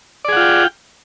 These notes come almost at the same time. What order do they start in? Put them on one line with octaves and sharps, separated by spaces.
D5 G#4 F#5 F4 G5